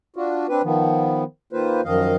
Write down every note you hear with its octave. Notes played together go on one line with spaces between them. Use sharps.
D4 F4 F#4
C4 D4 B4
D#3 F3 B3
D#3 A#3 F4 B4 C5
F#2 D#3 F3 D#5 F5